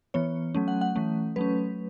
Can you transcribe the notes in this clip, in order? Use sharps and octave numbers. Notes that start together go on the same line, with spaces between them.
E3 B3 C#5
F#3 A3 C#4
F#5
F#5
E3 A3 C#4
F#3 A3 C#4 B4